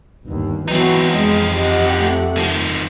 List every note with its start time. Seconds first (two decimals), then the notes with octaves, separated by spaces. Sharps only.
0.25 G1 D#2
0.68 E3 F#3 B3 C4 D#4 F#4
1.13 F2 G#3 D#5
1.56 G4 D#5 F#5
1.99 A3
2.37 D#3 F3